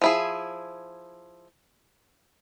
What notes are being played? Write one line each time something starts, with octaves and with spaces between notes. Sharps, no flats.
F3 E4 G#4